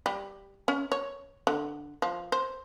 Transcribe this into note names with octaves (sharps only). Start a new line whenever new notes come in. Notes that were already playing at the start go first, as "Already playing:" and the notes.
G3
C#4
C#5
D3
F3
C5